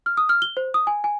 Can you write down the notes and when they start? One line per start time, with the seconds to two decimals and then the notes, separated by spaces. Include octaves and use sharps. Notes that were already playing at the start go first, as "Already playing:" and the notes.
0.06 F6
0.17 D#6
0.29 F6
0.42 G7
0.57 C5
0.74 D#6
0.87 G#5
1.04 G#5